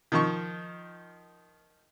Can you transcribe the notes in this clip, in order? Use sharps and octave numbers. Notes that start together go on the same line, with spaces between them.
D#3 F3 C#6